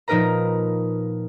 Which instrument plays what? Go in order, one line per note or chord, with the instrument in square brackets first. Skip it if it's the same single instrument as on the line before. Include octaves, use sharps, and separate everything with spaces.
[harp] A#2 F3 D#4 A#4 B4 A#5